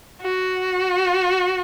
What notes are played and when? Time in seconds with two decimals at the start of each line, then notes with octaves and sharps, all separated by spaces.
0.22 F#4